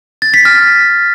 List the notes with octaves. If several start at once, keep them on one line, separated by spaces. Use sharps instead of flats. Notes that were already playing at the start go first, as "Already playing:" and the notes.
A6
B6
F6